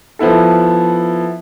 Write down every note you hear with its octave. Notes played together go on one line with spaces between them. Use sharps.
F3 B3 E4 A4